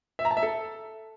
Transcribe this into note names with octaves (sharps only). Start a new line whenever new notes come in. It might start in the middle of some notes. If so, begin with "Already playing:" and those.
E5
A#5
A5
E5
A4